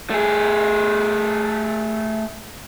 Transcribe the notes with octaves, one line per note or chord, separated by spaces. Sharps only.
A3 G#4